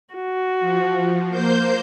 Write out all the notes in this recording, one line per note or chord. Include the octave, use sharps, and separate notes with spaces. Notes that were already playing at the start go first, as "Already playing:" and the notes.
F#4
F3
A#3 C5 G6